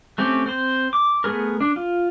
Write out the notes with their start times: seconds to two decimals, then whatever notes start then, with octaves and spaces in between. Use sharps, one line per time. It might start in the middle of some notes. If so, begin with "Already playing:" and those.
0.18 A3 C4 C#4 G4
0.46 C4 C5
0.93 D6
1.24 A3 B3 G#4 A#4
1.61 D4
1.76 F4